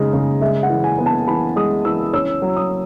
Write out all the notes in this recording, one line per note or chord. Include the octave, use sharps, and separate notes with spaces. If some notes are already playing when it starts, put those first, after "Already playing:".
Already playing: C#3 G#3 D#4
C#3
G#3 E5
F#5
E3
G#5
B3
A5
E3 B5
G#3 D#6
E3 E6
C#4 E6
F#3
D#6